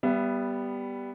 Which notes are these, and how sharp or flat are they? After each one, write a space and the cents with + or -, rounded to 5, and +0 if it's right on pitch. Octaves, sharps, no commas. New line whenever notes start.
G3 +0 B3 +0 E5 +30